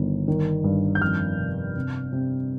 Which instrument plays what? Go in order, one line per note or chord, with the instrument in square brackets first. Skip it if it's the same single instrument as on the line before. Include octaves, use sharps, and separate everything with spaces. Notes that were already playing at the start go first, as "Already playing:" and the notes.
Already playing: [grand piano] G1 D#3
D#3
G2
G6
F2 F6
C3
C3
C3